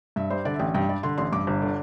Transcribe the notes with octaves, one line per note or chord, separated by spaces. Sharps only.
G2 E5
G3 C5
D3 D5
E5
A1 G5
G2 G5
G3 D5
D3 C6
A1 C6
G2 D6
G1
D3